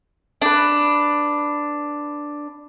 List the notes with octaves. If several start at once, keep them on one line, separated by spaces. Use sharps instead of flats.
D4 B4